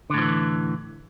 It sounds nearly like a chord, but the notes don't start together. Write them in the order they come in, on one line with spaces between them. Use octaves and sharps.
D3 A2 F3 E3